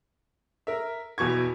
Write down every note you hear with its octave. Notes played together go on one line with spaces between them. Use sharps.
A#4 E5
E2 B2 C#6 G#6